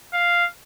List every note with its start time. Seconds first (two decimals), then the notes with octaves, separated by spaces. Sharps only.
0.14 F5